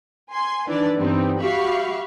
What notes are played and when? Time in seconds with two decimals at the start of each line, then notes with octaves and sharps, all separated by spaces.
0.32 G#5 C6
0.68 D#3 E3 D4 B4 D5
0.97 G2 E3 G3 B3 C4 D#4
1.40 F#4 G4 E5 F5 B5 C#6